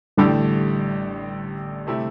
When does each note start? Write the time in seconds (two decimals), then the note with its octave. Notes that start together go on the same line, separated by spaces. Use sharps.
0.17 A1 A2 D3 G3 A3 D4 G4
1.87 C3 A3 E4 G4